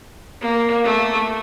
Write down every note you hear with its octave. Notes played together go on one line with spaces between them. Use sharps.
A#3
A3